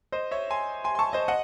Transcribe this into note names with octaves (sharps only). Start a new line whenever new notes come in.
C5 D#5
C#5 E5
G#5 C6
G#5 C6
C6
A5 C#6
C5 D#5
D#5 F#5